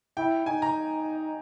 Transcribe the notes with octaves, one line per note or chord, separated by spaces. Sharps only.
E4 G5
D#4 G#5
A#5